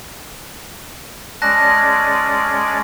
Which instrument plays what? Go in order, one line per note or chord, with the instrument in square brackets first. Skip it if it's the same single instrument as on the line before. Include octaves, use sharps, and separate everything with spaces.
[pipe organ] G#3 C#4 D5 [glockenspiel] A5 F#6 A#6